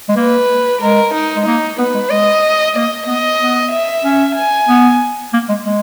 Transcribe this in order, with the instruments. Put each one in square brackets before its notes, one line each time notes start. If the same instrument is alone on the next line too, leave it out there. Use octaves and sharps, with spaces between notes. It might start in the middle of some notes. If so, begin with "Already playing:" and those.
[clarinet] G#3
[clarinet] A#3 [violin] B4
[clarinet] G#3 [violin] A#4
[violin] D#4
[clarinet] G#3
[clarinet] A#3 [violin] D#4
[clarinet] B3 [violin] B4
[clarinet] G#3
[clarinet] G#3 [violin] D#5
[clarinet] A#3 [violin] D#5
[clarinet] B3 [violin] D#5
[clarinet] B3
[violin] E5
[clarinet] C#4
[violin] G#5
[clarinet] B3
A#3
G#3
G#3